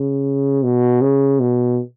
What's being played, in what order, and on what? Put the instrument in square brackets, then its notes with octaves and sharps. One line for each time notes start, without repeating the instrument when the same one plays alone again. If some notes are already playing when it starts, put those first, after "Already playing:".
Already playing: [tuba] C#3
B2
C#3
B2